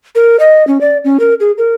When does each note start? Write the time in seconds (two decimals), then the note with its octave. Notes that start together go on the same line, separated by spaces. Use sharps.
0.15 A#4
0.40 D#5
0.67 C#4
0.81 D5
1.05 C#4
1.20 A#4
1.40 G#4
1.58 A#4